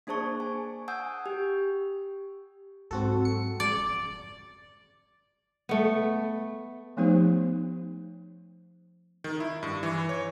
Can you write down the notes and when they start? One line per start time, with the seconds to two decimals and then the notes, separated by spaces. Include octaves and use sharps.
0.07 A#3 D4 G#4 C5 A5 C#6
0.40 G#5
0.88 F#5 G#5 D#6 E6 G6
1.26 G4
2.91 G#2 F#3 C4 F#4 A4
3.25 C#7
3.60 D5
3.77 F2 D3
5.69 A3 B3
6.97 F3 A3 B3 D#4 G4 C5
9.24 D#3
9.40 E4
9.63 G2
9.83 E3
10.09 C#5